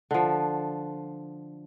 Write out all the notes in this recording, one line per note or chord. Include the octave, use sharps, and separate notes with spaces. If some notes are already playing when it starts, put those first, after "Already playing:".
D3 F3